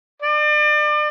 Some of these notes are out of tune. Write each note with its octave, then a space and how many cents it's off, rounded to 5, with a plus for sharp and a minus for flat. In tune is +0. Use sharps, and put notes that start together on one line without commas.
D5 +35